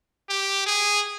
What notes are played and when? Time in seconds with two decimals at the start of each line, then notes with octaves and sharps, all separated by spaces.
0.29 G4
0.66 G#4